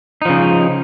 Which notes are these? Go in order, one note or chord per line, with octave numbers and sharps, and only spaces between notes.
C#3 F3 D#4